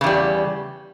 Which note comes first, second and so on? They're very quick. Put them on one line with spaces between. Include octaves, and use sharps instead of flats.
C#3 E2 G3